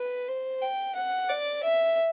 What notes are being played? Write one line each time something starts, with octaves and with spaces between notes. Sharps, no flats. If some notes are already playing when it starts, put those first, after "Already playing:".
Already playing: B4
C5
G5
F#5
D5
E5